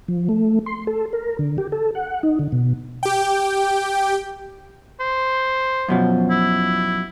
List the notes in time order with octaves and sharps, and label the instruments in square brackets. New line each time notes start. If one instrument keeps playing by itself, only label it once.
[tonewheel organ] F3
A3
C6
A4
A#4
D3
G4
A4
F#5
D#4
D3
B2
[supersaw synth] G4 G5
[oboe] C5
[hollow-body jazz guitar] F#2 B2 F3
[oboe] E4